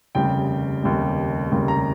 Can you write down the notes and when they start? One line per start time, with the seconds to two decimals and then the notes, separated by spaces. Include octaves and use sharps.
0.15 F1 D#2 C#3 G3 G5
0.83 F1 D#2 C#3 G3
1.52 F1 D#2 C#3 G3
1.68 A#5